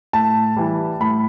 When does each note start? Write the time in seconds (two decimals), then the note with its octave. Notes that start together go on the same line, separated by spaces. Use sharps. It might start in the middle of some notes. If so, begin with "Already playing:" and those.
0.13 A2 A5
0.57 E3 G3
1.00 A2 B5